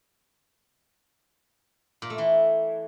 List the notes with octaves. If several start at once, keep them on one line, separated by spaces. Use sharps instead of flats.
A#2
A3
E3